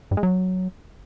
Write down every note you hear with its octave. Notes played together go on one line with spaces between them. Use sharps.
G2
G#3
F#3